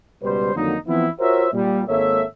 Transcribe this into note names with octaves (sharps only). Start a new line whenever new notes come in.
C#2 B2 G3 B4 C5
F2 D3 D#3 F#3 A#3 D#4
E3 F3 B3 C4 E4
F4 F#4 A#4 C5 C#5 E5
A#2 G3
G#1 G#3 A#3 A4 C#5 E5